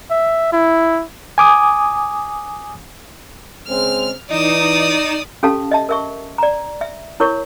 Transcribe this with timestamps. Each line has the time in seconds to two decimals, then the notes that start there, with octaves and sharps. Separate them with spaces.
0.10 E5
0.52 E4
1.38 G#5 D6 D#6
3.68 C#3 G#3 C4 F6
4.30 E3 D#4 D5 D#6 E7
5.43 C#4 G4 A4 F5 A5
5.71 D#5 E5 A5
5.89 A#4 E5 C#6
6.38 D5 A#5
6.81 E5
7.20 E4 A#4 C#5 C#6